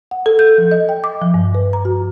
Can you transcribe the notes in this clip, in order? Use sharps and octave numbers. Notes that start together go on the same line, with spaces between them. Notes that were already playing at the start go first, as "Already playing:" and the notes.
F#5
A4
G6
F3
D#5
G5
D6
F3
G2
B4
A#5
F#4